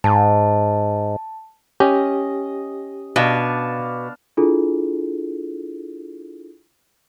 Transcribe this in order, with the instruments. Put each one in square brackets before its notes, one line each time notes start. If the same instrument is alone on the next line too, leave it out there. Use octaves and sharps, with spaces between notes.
[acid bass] G#2 [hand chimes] A5
[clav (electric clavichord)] C#4 [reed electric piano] G4 [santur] D#5
[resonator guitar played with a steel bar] B2 [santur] D4 F5 A5
[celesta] D4 E4 F4 G#4 A4